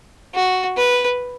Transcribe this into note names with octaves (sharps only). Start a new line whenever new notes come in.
F#4
B4